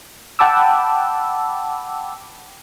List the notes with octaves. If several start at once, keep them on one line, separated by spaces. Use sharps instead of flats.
F#5 G5 A5 B5 D6 E6